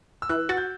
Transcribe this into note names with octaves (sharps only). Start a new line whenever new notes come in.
E6
E3 F#6
F#4 A6
G6